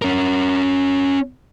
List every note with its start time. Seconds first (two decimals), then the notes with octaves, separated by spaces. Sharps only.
0.02 C#4 A#4